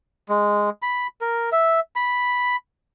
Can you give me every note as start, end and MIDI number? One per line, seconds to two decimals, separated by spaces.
0.29 0.70 56
0.82 1.07 83
1.21 1.50 70
1.52 1.80 76
1.96 2.56 83